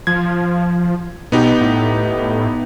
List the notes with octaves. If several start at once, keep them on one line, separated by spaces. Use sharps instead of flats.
F3 G#6
B2 B3 D#4 G4
A2